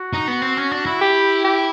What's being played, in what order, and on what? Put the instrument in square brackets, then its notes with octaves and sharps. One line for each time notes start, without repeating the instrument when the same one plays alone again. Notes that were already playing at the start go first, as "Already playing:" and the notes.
Already playing: [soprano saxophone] F#4
[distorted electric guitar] D#4
B3
C4
C#4
D4
E4
[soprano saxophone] G4
G4